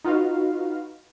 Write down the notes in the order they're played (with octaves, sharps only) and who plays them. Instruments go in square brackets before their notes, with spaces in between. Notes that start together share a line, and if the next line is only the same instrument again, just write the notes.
[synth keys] D#4 F4 F#4 B4 F5